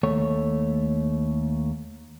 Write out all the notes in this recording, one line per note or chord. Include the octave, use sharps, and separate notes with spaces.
D#2 A3 C#5